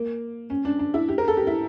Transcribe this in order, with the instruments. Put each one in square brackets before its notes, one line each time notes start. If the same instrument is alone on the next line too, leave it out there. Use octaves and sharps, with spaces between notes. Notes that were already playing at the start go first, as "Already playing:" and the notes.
Already playing: [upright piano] A#3
C#4
D4
D4
E4
G4
A#4
A4
G4
E4